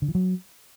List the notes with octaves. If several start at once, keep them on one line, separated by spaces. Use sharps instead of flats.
D3
E3
F#3